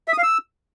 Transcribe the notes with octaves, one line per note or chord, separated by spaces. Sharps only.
E5
D#6
F5
E6